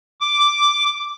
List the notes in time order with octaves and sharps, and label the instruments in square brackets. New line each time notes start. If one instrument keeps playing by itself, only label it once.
[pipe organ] D6